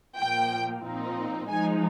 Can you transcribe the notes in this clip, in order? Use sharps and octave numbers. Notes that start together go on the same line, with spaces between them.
A#2 F3 A#3 G5
A#2 F3 C4 D#4
F3 G#3 D#4 G#5